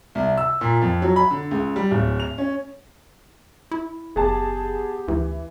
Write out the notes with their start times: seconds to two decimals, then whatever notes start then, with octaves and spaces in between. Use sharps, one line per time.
0.15 C2
0.37 E6
0.61 A#2
0.81 F2
1.02 F#3
1.16 B5
1.31 D3
1.51 C#2
1.76 G3
1.91 D1
2.20 F7
2.38 C#4
3.71 E4
4.16 F#1 B3 G4 G#4 A5
5.08 D2 E3